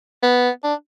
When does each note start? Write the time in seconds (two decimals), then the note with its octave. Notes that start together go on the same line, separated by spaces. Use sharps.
0.23 B3
0.64 D4